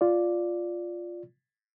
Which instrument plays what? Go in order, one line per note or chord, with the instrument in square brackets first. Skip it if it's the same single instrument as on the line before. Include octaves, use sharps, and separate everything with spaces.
[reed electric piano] F4 D5